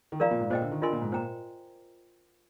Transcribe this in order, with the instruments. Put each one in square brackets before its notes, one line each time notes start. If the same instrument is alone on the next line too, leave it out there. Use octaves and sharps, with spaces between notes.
[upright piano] D#3
[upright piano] F3 [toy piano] F4 A#4 D5 F5 A#5
[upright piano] A#2
G#2
[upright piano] A#2 [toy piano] C5 D#5 G5
[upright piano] D3
D#3
[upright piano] D3 [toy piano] F4 A#4 D#5 G#5 C6
[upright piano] A#2
G#2
[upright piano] A#2 [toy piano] C5 G5 A#5